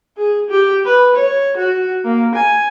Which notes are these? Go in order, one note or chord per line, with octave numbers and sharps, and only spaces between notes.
G#4
G4
B4
C#5
F#4
A#3
G#5